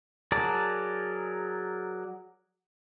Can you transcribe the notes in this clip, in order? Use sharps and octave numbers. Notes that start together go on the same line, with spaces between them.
F#3 G#4 A#4 D5 A5